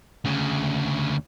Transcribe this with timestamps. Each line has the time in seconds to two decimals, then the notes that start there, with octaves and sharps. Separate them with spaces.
0.25 D2 C#3